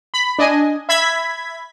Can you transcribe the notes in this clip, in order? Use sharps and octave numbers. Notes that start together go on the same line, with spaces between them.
B5
D4 D#5 G#5
E5 B5 G#6 B6